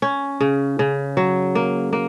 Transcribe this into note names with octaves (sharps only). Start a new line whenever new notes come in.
C#4
C#3
C#3
F#3
A#3
A#3